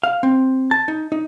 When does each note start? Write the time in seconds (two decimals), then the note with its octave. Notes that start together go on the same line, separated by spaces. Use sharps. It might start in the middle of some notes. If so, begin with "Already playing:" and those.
0.03 F5
0.23 C4
0.71 A5
0.88 D#4
1.12 D#4